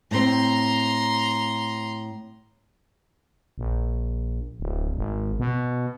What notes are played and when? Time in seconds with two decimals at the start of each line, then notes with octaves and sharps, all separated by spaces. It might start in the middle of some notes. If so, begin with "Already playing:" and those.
0.11 A2 C4 A#5 C6
3.58 A#1
4.60 D1
4.97 G#1
5.39 B2